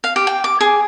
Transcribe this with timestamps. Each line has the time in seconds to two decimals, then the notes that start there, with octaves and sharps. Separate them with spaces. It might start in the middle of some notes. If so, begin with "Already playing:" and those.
0.04 F5
0.16 G4
0.27 G5
0.44 D6
0.61 G#4